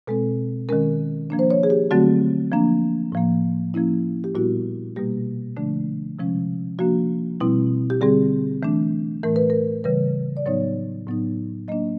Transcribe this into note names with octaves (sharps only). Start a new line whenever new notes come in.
B2 G#3 C4 A4
D#3 G#3 C#4 A#4
F3 A#3 D4
C5
C#5
G#4
G4
D3 F#3 A3 C4 F#4
F3 A#3 D4
A2 F3 A#3
F3 A#3 C#4 E4
G4
A#2 G3 B3 E4 F#4
B2 G3 A#3 G4
D3 F3 A3 D4
C3 F3 G#3 C#4
F3 A#3 D4 F#4
B2 G3 C4 E4
G4
D3 G3 C4 G#4
E3 A3 D4
A2 E3 A3 A#4
B4
A#4
C#3 E3 G3 B4
D5
A2 F#3 B3 D#4 C#5
A2 F#3 B3 D#4
F#3 A#3 D4 D#5